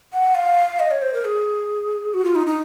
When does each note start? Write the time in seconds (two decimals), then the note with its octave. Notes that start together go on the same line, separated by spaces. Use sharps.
0.13 F#5
0.35 F5
0.79 D#5
0.91 C#5
1.02 C5
1.13 A#4
1.25 G#4
2.14 F#4
2.24 F4
2.35 D#4
2.47 D#4